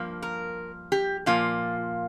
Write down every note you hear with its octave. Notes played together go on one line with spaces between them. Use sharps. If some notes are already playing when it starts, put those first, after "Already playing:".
Already playing: G2 F3 A#3
A#4
G4
A#2 F3 A#3 F4